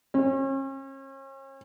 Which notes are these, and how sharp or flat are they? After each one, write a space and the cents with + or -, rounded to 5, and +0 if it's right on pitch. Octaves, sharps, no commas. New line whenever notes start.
C#4 -40